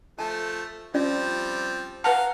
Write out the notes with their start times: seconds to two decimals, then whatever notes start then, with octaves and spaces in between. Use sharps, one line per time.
0.19 F3 A3 A5
0.94 F3 G3 C4 C#4 F4 D5
2.04 B4 F5 F#5 A5 A#5 F6